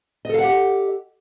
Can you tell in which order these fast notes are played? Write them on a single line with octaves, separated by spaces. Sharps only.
D#5 A4 F5 F#5 G4